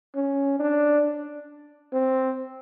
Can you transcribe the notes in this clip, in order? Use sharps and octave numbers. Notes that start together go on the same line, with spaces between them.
C#4
D4
C4